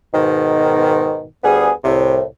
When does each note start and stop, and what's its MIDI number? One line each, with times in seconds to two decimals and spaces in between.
0.14 1.23 44
0.14 1.23 47
0.14 1.23 51
1.44 1.70 38
1.44 1.70 55
1.44 1.70 59
1.44 1.70 68
1.84 2.22 36
1.84 2.22 45
1.84 2.22 48